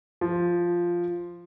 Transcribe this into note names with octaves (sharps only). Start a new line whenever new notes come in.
F3